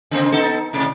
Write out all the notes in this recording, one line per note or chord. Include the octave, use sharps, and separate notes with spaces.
C#3 A#3 C4
B3 D#4 A4
A2 C3 D5